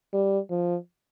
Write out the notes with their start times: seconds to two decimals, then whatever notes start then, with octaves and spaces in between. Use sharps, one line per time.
0.13 G3
0.50 F3